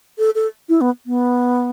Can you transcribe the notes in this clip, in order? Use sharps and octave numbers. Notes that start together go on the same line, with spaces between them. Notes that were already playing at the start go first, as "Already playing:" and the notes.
A4
A4
E4
B3
B3